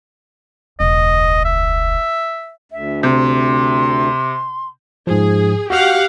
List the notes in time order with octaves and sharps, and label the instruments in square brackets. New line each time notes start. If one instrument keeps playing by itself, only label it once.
[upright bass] E1 C#2 [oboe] D#5
[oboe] E5
[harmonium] D2 [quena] E5
[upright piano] C3 [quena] C6
[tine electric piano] G#2 F3 [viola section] G#4
[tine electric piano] F#4 [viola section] G4 F5 F#5